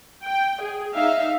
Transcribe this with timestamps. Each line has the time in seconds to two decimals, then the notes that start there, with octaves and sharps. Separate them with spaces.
0.23 G5
0.62 G#4
0.94 D#4 E5 F5